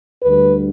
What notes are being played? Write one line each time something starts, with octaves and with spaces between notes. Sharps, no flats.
D2 D3 G3 B4